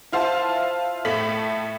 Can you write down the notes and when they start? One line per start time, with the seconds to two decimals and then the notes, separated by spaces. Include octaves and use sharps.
0.12 E4 F4 C5 F5 A5
1.05 A2 A3 B6 F#7